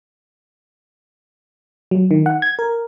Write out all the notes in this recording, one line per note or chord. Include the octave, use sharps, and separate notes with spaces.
F#3
D#3
F#5
G#6
A#4